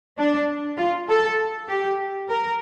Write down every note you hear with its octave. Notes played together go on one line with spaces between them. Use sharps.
D4
F4
A4
G4
A#4